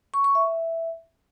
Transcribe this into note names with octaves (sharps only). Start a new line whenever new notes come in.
C#6
C#6
E5